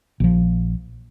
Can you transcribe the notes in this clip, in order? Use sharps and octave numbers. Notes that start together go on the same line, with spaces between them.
A#1 F3